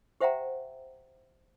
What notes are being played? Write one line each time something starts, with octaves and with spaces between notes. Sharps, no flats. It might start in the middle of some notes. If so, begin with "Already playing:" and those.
G4 C5 E5 F#5 G5 A#5